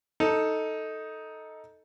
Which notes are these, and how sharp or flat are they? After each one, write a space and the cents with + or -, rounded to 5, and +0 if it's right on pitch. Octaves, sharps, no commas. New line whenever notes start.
D#4 +10 A4 +5